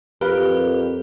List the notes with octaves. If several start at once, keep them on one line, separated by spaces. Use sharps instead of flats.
F2 G4 A#4 B4 F5